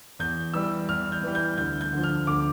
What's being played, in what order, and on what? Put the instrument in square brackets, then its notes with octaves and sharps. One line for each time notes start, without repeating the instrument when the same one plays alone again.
[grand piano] E2 G6
E3 G3 E6
E2 F6
G6
E3 G3
G6
D2 G6
G6
D3 F3
F6
D2 D6